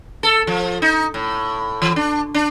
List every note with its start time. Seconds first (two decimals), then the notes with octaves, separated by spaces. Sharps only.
0.23 A4
0.47 F3
0.82 D#4
1.14 A2
1.82 E3
1.96 D4
2.34 D4